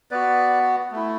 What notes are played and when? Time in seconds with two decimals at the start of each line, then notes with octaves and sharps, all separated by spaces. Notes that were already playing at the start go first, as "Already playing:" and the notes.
0.11 B3 F#4 B4 D5
0.91 A3 E4